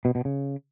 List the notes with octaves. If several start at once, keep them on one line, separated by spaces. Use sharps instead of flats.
B2
B2
C#3